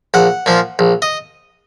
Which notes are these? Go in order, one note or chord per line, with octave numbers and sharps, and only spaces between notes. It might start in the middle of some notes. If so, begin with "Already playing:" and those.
A#1 F#5
A#2 F3
A#1
D#5